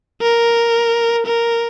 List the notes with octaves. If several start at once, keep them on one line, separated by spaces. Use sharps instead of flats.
A#4
A#4